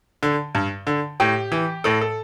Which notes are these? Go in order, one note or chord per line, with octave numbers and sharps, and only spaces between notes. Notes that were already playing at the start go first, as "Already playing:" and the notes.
D3
G2
D3
A2 G4
E3
A2 A4
A4